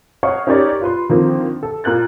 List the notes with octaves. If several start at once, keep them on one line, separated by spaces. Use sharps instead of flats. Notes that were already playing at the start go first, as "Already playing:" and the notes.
C#5 D#5 F5 F#5 C#6
C#4 D#4 G4 A#4 C#5 D5
F4 B4 C6
D3 D#3 F3 A#3 C4
A4
A#2 A#4 F#6 A6